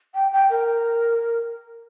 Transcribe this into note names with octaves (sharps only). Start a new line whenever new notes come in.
G5
G5
A#4